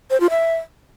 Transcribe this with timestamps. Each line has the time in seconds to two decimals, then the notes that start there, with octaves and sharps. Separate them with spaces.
0.10 C5
0.20 F4
0.30 E5